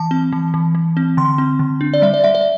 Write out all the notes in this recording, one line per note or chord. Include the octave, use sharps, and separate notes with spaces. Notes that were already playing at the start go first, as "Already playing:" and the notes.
Already playing: E3 A5
C4
E3
E3
E3
C4
D3 C6
C4
D3
D4
D5
G3 E5
D5
G3 E5
D5